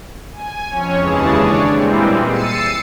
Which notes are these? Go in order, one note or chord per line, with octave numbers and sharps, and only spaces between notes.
G#5
F2 C#4 C#5
D#2 C#3 E3 G#3 G#4 A5
D4 C#5 D5
A#2 E3 G3 G#3 C4
E6 A6 C7 C#7 D#7